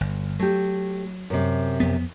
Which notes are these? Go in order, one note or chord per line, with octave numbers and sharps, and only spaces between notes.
G1
F#3 A3 G4
F#2 C3
F2 B3